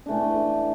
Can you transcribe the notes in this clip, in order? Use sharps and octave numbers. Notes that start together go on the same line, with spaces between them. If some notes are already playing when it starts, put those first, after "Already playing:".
E3 A3 D4